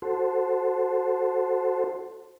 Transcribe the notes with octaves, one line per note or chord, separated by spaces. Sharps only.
F#4 A4 C5